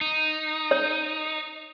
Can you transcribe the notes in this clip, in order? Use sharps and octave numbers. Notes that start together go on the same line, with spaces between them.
D#4
C#5